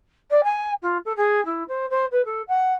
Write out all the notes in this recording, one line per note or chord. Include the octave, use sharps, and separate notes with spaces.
D5
G#5
F4
A4
G#4
E4
C5
C5
B4
A4
F#5